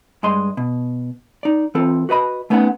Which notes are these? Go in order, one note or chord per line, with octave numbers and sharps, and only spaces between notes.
G2 G#3 D#5 C6
B2
D#4 D5
E3 C4 F4 A4
F#4 B4 D#5 B5
A3 B3 C#4 D#4 E5 F#5